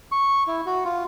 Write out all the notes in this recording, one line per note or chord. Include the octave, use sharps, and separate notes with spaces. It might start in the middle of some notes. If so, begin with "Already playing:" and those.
C#6
E4
F#4
F4